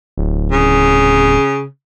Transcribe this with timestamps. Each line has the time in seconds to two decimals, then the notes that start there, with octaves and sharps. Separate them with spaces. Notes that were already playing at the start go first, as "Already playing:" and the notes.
0.17 D1
0.52 C#3